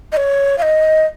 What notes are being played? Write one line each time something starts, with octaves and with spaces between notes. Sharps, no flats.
D#5
C#5
F5
D#5